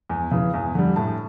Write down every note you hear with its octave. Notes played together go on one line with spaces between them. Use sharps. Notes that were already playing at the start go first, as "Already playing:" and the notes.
E2
C#3 E3
E2
D3 G3
A2 A5